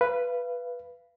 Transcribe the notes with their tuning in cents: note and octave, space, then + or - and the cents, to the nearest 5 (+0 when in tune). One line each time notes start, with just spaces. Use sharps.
B4 +0 F5 -30